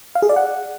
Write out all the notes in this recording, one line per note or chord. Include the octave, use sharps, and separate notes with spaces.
F5
G#4
D5
F#5